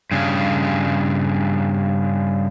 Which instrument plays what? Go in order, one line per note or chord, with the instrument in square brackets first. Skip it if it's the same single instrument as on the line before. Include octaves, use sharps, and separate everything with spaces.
[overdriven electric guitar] G2 C#3